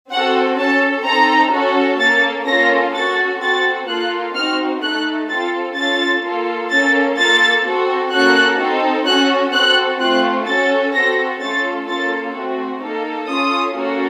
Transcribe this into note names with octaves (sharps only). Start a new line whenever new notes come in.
C4 F#4 A4 F#5
C#4 A4 A5
C4 D#4 A4 A#5
C#4 F#4 A4
A#3 C#4 A4 A6
A#3 C#4 F4 A4 A#6
C#4 F#4 A4 A6
C4 F#4 A4 A6
A#3 F4 A4 F#6
C4 D#4 F#4 F6
A3 D#4 A4 F#6
C4 F4 A4 A6
C#4 F4 A4 A6
A#3 F4 A4
A#3 C#4 A4 A6
A#3 F4 A4 A6
C4 F#4 A4
A#3 C#4 F#4 A4 F#6
C4 D#4 A4
C#4 F#4 A4 F#6
C4 F#4 A4 F#6
A3 C4 F4 F#6
C#4 F#4 A4 A6
C4 F#4 A4 A#6
A3 C#4 F4 A4 A6
A#3 C#4 F4 A4 A6
A3 C4 F#4
A#3 D#4 A4
C#4 F4 A4 D#6
A#3 C#4 F#4 A4